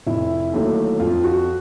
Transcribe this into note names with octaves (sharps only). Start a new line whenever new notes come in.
F1 E4
D#2 D3 F#3 A3
F2 F4
F#4